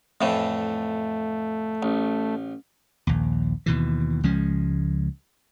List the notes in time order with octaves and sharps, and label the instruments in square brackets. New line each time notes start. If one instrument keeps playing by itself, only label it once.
[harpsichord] F2 A2 E3 [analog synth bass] A3
[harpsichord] A1
[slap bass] A#1 D#2
D#2 B2 E3
C#2 F3 G#3 C#4